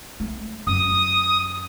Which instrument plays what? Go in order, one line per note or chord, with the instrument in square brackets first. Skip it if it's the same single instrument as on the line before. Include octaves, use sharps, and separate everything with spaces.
[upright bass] A3
[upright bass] F#2 [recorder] D#6